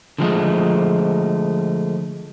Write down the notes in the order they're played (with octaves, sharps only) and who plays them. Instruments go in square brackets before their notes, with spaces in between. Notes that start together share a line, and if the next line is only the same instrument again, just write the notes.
[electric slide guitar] D3 F3 G#3 A3